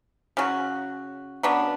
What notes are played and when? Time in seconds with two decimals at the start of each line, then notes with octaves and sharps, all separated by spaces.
0.37 C#3 F#3 C#4 F#4
1.43 C#3 F#3 B3 D4